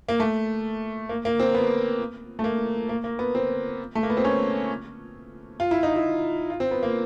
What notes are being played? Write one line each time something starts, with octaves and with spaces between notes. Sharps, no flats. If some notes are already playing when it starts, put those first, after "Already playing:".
A#3
A3
A#3
A#3
C4
B3
A3
A#3
A#3
A#3
B3
C4
A3
A#3
B3
C4
C#4
F4
E4
D#4
E4
F4
C4
B3
A#3